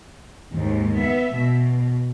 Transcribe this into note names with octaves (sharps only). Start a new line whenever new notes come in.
D#2 G#2
B3 E5
B2